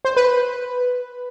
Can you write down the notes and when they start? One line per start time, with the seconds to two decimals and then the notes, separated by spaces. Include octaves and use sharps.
0.05 C5
0.16 B4